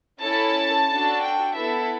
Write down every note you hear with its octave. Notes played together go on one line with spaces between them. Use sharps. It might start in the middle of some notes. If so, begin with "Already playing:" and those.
C#4 E4 A4 A5
D4 F#4 A4
G5
B3 E4 A4 E5